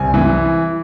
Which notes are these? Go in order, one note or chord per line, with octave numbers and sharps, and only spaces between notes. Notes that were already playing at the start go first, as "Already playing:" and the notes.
Already playing: C2 G#5
E3